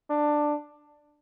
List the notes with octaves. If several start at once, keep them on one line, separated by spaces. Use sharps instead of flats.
D4